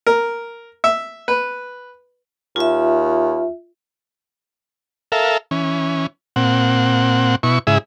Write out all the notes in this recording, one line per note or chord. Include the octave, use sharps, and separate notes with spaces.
A#4
E5
B4
D#2 F4 E5
A4 A#4 E5 F5
E3 C#4
A#2 C4 F#5
B2 E4 C#6
G#2 C#3 E4 G#4 E5